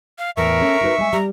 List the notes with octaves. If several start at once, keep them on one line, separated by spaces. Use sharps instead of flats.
F5
E2 A2 A#4 E5 C#6 E6
C#4 A4 G#5
D#4 F#4 B4
G#3 G#5
G3 A#5